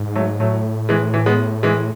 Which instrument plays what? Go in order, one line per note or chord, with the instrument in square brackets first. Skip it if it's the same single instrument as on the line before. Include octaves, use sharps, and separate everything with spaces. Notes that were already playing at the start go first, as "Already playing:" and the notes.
Already playing: [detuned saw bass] G#2
[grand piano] F#3 A3
[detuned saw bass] A2 [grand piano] F#3 A3
[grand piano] E3 G#3
E3
G#3 B3
E3 G#3